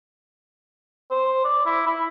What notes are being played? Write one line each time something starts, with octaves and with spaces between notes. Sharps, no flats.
C5
D5
E4
E4